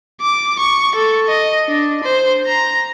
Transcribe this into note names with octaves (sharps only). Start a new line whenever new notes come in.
D6
C#6
A4
D#5
D4
C5
A#5